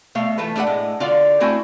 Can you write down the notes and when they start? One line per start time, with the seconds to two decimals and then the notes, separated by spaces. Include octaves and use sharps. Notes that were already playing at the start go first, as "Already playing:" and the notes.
0.15 B2 A3 F5
0.38 E3 A3 F4 A4 B4
0.56 A3 D4 A4 B4 F#5
0.67 A2 G#3
1.00 D3 F4 F#4 D5 F5
1.40 A3 C4 E4 F#4 C5 G#5